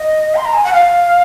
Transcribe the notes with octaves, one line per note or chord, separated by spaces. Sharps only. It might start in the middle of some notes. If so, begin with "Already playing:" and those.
Already playing: D#5
C6
A#5
G#5
F#5
F5